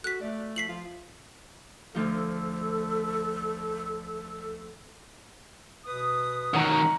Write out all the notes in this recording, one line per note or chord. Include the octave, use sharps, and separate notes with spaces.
F#4 A4 F#6 B6
A3 D5
F3 B6 C7 F#7
F3 F4
D2 F3 A4
B2 B4 D#6
D#3 F#3 F#5 A#5 C#6